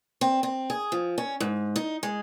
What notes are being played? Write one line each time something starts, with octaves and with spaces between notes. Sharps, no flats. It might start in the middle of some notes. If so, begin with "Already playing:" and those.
C4
C4
G#4
F3
C#4
G#2
D#4
G#3